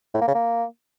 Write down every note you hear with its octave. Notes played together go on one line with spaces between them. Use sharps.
A2
A#3
C#3
A#3